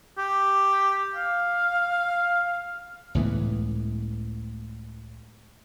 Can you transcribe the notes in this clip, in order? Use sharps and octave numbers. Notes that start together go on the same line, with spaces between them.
G4
F5
C#2 A2 E3 B3